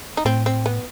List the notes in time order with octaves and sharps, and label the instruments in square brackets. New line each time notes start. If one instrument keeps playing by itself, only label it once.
[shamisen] D#4
[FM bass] A2 [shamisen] C4
[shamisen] C4
B3